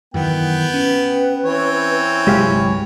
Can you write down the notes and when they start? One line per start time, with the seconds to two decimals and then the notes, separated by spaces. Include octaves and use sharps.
0.14 F#2 D#3 E3 B3 G5
0.74 C#4 B4
1.44 E3 C4 C#5
2.27 G1 C2 F#3 G#3 G4 F5